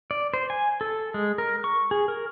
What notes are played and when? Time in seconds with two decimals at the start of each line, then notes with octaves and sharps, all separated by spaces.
0.11 D5
0.34 C5
0.50 G#5
0.81 A4
1.14 G#3
1.38 A#4
1.64 C#6
1.91 G#4
2.08 A#4